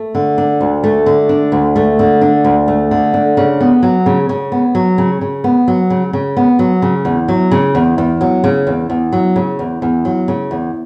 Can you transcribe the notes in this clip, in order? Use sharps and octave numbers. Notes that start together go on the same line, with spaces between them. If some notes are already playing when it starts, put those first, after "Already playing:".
Already playing: A3
D3
D4
D2
A3
D3
D4
D2
A3
D3
D4
D2
A3
D3
D4
C#3
B3
F#3
C#3
C#3
B3
F#3
C#3
C#3
B3
F#3
C#3
C#3
B3
F#3
C#3
E2
F#3
C#3
E2
E2
F#3
C#3
E2
E2
F#3
C#3
E2
E2
F#3
C#3
E2